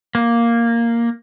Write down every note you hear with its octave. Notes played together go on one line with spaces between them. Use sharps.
A#3